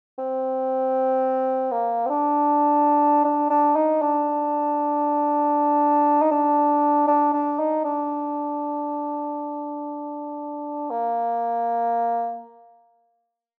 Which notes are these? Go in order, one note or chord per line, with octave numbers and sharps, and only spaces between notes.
C4
A#3
C4
D4
D4
D4
D#4
D4
D#4
D4
D4
D4
D#4
D4
A#3